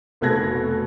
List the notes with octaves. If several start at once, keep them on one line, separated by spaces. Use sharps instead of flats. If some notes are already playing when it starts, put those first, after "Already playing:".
F1 B2 A4 F#6 G#6 A#6